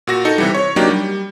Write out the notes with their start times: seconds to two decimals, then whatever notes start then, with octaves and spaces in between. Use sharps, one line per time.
0.07 A#2 F#4 A#6
0.25 D#4 A4 C#7
0.38 C3 E3 G3
0.55 C#5
0.76 F#3 A#3 D4 D#4 G4
0.90 G3